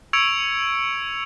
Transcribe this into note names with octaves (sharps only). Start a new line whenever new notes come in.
C#6 E6 G#6 C#7 D7 F7